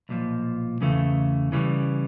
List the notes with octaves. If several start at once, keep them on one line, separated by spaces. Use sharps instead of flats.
B1 A#2 F3
E2 C#3 E3 A3
C#3 E3 G3